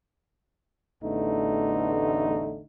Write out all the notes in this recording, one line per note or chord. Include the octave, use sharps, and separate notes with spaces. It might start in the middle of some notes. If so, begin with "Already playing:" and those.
A1 E2 D3 A3 D#4